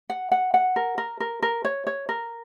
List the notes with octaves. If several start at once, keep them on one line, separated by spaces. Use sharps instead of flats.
F#5
F#5
F#5
A#4
A#4
A#4
A#4
C#5
C#5
A#4